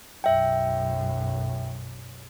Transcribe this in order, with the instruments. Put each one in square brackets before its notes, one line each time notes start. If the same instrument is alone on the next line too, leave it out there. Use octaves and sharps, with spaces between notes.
[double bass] B1 F#2 [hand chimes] E5 G5